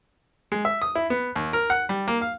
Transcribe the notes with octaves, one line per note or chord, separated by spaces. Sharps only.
G#3
E5
D#6
E4
B3
D#2
A#4
F#5
G3
A#3
F5